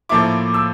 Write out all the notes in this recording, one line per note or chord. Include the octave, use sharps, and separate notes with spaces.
A2 F3 A#3 E4 D6
E6